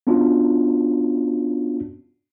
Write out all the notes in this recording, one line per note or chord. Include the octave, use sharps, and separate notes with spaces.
B3 C#4 D4 F4 F#4